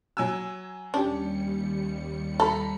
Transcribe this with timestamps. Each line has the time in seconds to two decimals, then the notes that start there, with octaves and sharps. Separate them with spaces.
0.17 F#3 G#5 E6
0.94 D#2 G3 C#4 D4 G4 C#7
2.40 A4 A#5 B5